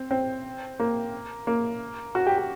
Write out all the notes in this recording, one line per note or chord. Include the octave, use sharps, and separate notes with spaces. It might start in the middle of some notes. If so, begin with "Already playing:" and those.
Already playing: C4
C4
A#3
A#3
F#4
G4
G4